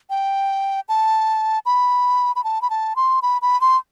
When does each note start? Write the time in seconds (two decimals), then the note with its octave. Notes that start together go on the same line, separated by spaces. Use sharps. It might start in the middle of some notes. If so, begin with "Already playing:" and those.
0.10 G5
0.89 A5
1.66 B5
2.36 B5
2.44 A5
2.62 B5
2.70 A5
2.96 C6
3.22 B5
3.42 B5
3.61 C6